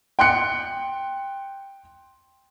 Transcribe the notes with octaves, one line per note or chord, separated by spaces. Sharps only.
G5 C6 F#6 C#7